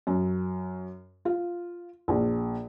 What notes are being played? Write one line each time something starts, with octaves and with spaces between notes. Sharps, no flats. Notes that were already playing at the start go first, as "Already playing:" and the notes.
F#2
F4
A#1